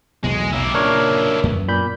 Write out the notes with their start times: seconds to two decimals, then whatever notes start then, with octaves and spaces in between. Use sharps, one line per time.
0.24 B1 E2 B2 G#3
0.53 B1 A#3 E4
0.74 A#2 C#3 D4 A#4 C#5
1.43 F#2 B3
1.68 A#2 B5 G6